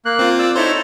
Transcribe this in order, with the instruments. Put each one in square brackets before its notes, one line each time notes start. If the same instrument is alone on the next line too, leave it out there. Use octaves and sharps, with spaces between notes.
[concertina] A#3 F#6
[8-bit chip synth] C4 F4
[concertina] D5 E6
[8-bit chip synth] D#4 E4 C5 [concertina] A4 C#5 A#5